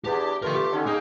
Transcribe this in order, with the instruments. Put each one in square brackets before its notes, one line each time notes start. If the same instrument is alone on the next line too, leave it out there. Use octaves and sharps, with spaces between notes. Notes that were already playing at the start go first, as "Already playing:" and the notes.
[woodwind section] E2 D4 [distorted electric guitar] G4
[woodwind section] G2 A3 F4 [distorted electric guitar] A#4 G5
[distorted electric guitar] G4
[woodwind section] D3 D#3 C#4
[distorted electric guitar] A#3 [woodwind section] D#4 G#4 G5